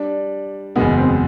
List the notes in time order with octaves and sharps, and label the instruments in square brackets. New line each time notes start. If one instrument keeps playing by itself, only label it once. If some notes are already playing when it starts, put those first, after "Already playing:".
Already playing: [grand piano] G3 [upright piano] D4
[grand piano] F#1 E2 B2 G#3 [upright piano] B3
[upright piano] C4